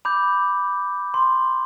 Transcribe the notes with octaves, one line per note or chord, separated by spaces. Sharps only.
B5 D6 G6
C6